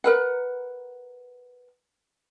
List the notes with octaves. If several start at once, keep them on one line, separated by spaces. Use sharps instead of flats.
A#4 B4 F#5